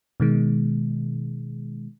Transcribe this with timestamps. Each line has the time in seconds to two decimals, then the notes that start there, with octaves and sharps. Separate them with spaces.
0.20 B2 D#3 G#3